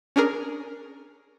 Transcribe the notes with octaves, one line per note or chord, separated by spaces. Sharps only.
C#4 D4 G#4 A#4